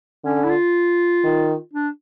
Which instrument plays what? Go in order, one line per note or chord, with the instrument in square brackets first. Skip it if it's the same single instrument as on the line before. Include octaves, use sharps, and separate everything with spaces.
[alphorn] D3 [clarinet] C#4
[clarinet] E4
F4
[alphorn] D#3
[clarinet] D4